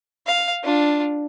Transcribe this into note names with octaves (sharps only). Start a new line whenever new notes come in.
F5
D4 F4